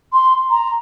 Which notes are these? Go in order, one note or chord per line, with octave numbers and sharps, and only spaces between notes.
C6
A#5